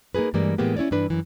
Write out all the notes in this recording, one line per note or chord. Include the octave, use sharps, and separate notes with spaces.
A#3 D#4 F#4 G#4 B4
G2 E3 G3 G#3 A#3 D5
A2 E3 G#3 A#3 B3 G4
C#4 E4 C#5 D5
G2 E3 D4 B4
F#2 E3